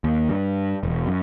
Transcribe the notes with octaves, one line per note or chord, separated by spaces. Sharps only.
D#2
G2
E1
F#2